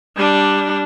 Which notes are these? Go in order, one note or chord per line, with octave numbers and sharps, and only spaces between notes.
G3 D4